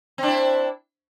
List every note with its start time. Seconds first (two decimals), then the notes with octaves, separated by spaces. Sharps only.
0.18 C4
0.23 D4
0.28 E4